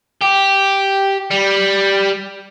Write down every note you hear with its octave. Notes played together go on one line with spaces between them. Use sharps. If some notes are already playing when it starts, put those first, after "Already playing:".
G4
G3